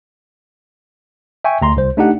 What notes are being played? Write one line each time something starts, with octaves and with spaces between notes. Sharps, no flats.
E5 G5 G#5 C#6
D2 A#5 C6
C2 C5
A3 D4 D#4 G4 F#5